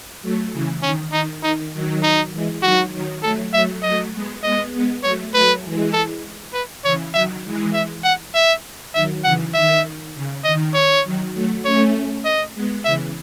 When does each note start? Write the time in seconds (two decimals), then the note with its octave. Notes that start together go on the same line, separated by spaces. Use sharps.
0.22 F#3 A3
0.53 C#3 E3
0.82 D#3 C#4
1.12 D#3 D#4
1.43 D#3 D#4
1.73 D#3 F#3
2.03 D#4
2.33 E3 G#3
2.62 D#3 F#3 F#4
2.93 D#3 F#3
3.23 F#3 A3 A4
3.53 F#3 A3 E5
3.83 F#3 A3 D#5
4.13 G#3 B3
4.43 G#3 B3 D#5
4.73 G#3 B3
5.03 F#3 A3 C#5
5.34 F#3 A3 B4
5.64 E3 G#3
5.93 A4
6.53 B4
6.84 C#3 E3 C#5
7.14 D#3 F#3 E5
7.44 E3 G#3
7.74 E5
8.04 F#5
8.35 E5
8.94 D#3 F#3 E5
9.24 C#3 E3 F#5
9.54 D#3 E5
10.15 C#3
10.44 D#3 D#5
10.74 C#5
11.04 D#3 F#3
11.34 F#3 A3
11.65 A3 C#4 C#5
12.25 D#5
12.55 G#3 B3
12.85 C#3 E3 E5